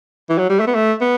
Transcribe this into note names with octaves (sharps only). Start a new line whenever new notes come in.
E3
F#3
G3
A3
B3
A3
B3